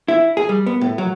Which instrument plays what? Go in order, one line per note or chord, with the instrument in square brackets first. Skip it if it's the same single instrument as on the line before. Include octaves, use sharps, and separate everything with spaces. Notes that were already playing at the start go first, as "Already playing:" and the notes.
[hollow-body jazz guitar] E4
G#4
G3
B3
A2
F#3